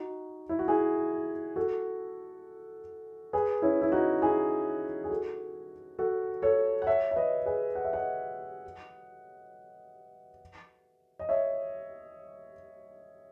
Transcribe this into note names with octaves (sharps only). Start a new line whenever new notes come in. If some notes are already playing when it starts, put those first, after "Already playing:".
Already playing: D#4 F#4
E4
F#4
E4 G#4
F#4 A4
G#4 B4
C#4 E4
E4
D#4 F#4
E4 G#4
G#4
F#4 A4
F#4 A4
A4 C#5
F#5
C#5 E5
E5
B4 D#5
G#4 B4
F#5
E5
D#5 F#5
D#5
C#5 E5